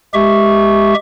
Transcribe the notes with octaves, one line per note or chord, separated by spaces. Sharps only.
G#3 G4 E5 C#6